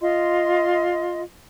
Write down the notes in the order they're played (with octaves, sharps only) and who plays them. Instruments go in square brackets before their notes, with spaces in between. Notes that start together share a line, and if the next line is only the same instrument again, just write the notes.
[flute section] F4 D#5 C6